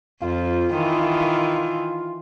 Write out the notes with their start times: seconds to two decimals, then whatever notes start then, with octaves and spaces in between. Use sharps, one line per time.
0.22 F2 F4
0.73 D#3 E3